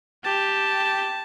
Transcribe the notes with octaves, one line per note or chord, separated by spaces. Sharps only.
G4 A5